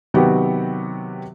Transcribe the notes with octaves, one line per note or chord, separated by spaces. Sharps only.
C3 D#3 F#3 B3 F#4 G4